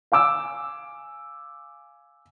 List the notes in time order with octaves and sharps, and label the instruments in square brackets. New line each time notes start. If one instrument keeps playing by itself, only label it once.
[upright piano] F5 G#5 D6 E6